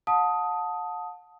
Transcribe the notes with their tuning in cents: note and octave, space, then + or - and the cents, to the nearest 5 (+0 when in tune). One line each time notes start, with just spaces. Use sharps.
F#5 -45 A5 +0 D#6 +10